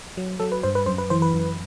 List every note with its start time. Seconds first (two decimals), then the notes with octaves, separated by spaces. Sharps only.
0.17 F#3
0.40 F#3 A4
0.52 B4
0.63 G2 C5
0.75 B4
0.86 F#2 C5
0.98 B4
1.10 E3 C5
1.22 B4
1.34 F#2